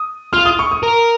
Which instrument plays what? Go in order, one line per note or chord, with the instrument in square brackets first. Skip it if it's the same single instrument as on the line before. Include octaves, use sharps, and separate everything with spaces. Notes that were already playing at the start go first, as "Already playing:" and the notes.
Already playing: [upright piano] D#6
[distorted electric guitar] F4 [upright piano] F6
[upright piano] D#6
C#6
D#6
[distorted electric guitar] A#4